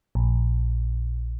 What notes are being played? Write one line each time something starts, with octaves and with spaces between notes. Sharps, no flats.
A#1